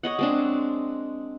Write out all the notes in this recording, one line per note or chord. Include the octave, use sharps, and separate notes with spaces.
C#5 D#5 F#5
G#3 C4 D4